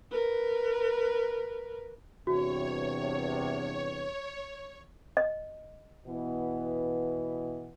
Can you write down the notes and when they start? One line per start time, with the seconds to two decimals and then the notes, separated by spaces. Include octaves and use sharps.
0.11 A#4 B4
2.27 E2 G2 C3 F#4 C#5
5.17 D#5
6.07 B2 E3 B3